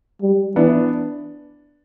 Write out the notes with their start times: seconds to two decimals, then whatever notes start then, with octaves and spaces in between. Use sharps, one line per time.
0.22 G3
0.56 E3 B3 D4